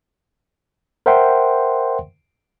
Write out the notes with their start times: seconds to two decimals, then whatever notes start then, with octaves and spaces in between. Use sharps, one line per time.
1.06 A#4 C5 E5 F#5 G5 C6